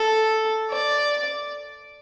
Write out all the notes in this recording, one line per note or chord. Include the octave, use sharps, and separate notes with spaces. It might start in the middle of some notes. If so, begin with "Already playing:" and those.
Already playing: A4
D5